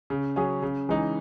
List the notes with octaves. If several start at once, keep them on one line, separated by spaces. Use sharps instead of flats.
C#3
F#3 C#4 G#4
C#3
E3 G#3 D#4